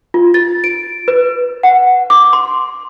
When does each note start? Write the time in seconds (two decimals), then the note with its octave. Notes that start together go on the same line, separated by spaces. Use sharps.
0.14 F4
0.34 A6
0.64 D7
1.08 B4
1.63 F#5
2.10 D6
2.33 C6